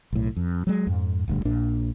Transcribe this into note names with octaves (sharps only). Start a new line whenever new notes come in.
B1 A2
F2
F#3 G#3
F2 G#2
D#1 D2 G2
A#1 A#2 D4